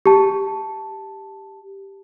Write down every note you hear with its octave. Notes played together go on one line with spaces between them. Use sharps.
G4 A5